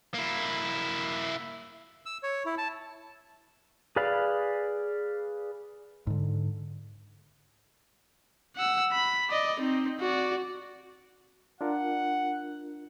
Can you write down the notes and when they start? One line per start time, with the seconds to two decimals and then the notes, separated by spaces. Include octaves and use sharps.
0.14 A#3 E4
2.06 E6
2.23 C#5
2.45 E4
2.58 A5
3.96 G#4 B4 D5 F5 B5
6.07 G#2 D3
8.56 F#5 E6
8.92 B5
9.30 D5 D#5
9.60 C4 D#4
10.00 F#4 D5
11.61 D4 F4 A#4 F#5